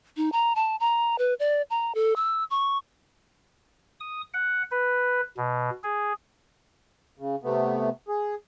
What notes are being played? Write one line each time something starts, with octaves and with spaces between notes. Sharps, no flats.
D#4
A#5
A5
A#5
B4
D5
A#5
A4
E6
C#6
D#6
F#5
B4
B2
G#4
C#3
C3 A3 B3
G#4